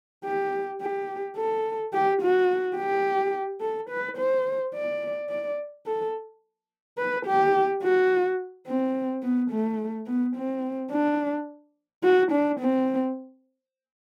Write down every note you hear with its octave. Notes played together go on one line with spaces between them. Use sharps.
G4
G4
A4
G4
F#4
G4
A4
B4
C5
D5
D5
A4
B4
G4
F#4
C4
B3
A3
B3
C4
D4
F#4
D4
C4